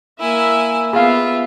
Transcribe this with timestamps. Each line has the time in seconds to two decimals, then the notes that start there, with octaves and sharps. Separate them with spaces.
0.20 A#3 E4 E5 G#5
0.93 B3 F4 G#4 E5 F5